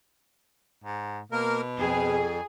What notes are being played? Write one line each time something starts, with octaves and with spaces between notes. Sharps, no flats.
G#2
B2 A#3 A#4
F2 G#4